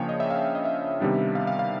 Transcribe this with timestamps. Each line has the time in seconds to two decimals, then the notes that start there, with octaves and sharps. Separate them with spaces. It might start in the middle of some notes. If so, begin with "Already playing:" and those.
Already playing: C#3 F3 A#3 D4 C#5 G5
0.09 D#5
0.20 E5
0.30 F5
0.55 D#5
0.65 E5
1.00 C3 D#3 G3 B3 D4
1.35 F5
1.47 F5
1.59 F5